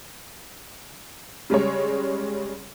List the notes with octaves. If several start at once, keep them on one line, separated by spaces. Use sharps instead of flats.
C#3 G3 G#3 C#5